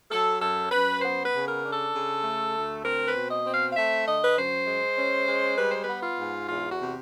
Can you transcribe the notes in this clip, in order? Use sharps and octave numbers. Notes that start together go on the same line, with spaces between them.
F#3 A4
F#2 A4
F#2 B4
B3 C5
B4
C#3
A#4
D4
A4
C#3
A3
D2
C4 A#4
B4
B2
D#5
C4
F5
F5
A3 E5
D3 D#5
B4
F#2 C5
G#3
C#4
G#3
G3 B4
C5
B4
B3
F4
G#2
E2 F4
F#4
C3